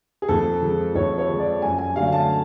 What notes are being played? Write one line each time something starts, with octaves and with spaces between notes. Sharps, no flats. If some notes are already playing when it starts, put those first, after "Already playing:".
G#4
F2 A4
F3 G#3
F2 C#5
C#5
F3 G#3
D5
F#2 G#5
G#5
D3 F#3 A3 F5
A5